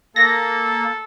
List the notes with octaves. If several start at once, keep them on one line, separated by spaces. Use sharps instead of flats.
A#3 A4 A#6